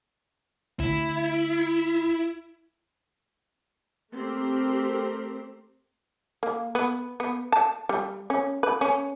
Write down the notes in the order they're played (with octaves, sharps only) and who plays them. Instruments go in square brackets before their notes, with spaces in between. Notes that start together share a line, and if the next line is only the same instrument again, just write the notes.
[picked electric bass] D2 [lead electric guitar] E4
[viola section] A3 C4 G4 A#4
[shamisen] A#3
B3
B3
A5
G3
C#4
B4
C#4